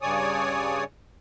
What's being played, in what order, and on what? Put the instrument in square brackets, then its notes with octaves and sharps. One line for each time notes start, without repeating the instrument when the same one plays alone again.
[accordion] G2 C#3 C#5 D5 G#5 D#6